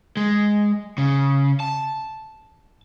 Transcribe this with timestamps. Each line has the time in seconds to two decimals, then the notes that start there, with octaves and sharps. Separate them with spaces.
0.17 G#3
0.98 C#3
1.60 A5